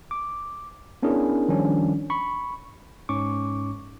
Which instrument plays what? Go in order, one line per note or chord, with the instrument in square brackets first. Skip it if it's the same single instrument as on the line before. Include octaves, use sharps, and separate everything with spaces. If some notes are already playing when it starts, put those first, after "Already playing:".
[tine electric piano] D6
B3 C#4 D4 E4 G#4 A#4
D#3 F3 G3 C#4 D4
B5 C#6
G#2 C#4 C#6 D6